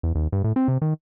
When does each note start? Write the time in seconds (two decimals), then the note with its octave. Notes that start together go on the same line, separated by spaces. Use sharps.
0.03 E2
0.15 D#2
0.32 G2
0.44 A2
0.56 C4
0.68 C3
0.82 D#3